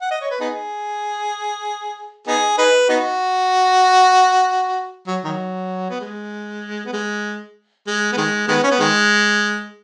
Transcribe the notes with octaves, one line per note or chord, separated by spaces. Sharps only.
F#5
D#5
C#5
B4
B3 D#4 G#4
B3 D#4 G#4
D#4 G#4 B4
B3 D#4 F#4
F#3
D#3 F#3
B3
G#3
B3
G#3
G#3
B3
D#3 G#3
D#3 G#3 B3
C#4
B3
D#3 G#3